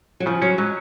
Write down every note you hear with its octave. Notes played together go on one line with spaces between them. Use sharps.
F#3
C#3 F3
F#3 C#4
F#3 G#3